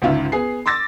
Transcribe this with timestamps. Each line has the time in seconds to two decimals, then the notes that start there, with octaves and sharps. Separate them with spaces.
0.02 G1 C#2 G#2 C#4 F4 E5
0.32 B3 G#4 C7
0.66 C6 D6 E6 A6 A#6